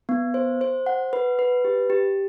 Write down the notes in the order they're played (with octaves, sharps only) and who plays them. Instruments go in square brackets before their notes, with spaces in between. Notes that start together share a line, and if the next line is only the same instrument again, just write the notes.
[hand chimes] B3
C5
C5
F#5
B4
B4
G4
G4